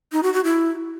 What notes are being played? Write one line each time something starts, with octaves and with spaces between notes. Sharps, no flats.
D#4
F#4
F#4
E4